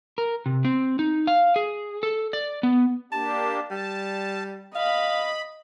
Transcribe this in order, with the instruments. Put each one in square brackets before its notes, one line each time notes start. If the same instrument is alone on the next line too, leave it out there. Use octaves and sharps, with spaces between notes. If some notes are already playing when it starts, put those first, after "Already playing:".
[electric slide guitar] A#4
C3
C4
D#4
F5
G#4
A4
D5
B3
[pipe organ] A#3 D4 G4 [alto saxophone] A5
[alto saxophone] G3 [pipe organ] A5
[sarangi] D#5 [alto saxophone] F5 [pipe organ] B5